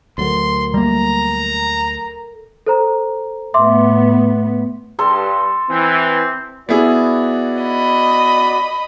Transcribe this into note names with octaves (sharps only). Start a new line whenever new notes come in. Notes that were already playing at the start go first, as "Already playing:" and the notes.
D2 F#3 A4 A#4 C6
G3 A#3 A#5
A4 C5 A#5
A2 B3 E5 C6 D6
G2 A4 C6
E3 C4
B3 E4 F#4 G#4 D5
D#5 B5